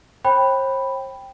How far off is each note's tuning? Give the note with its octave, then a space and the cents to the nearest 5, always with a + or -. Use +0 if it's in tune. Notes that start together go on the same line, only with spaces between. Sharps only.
C5 +45 G5 +0 B5 +0